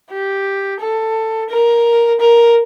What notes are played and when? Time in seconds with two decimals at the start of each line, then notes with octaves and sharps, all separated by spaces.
0.10 G4
0.80 A4
1.49 A#4
2.20 A#4